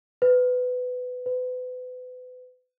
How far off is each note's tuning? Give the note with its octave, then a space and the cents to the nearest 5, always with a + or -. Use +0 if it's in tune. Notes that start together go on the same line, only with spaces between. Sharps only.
B4 +20
B4 +35